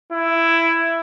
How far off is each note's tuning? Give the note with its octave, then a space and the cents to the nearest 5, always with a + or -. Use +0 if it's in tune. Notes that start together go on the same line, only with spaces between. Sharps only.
E4 +10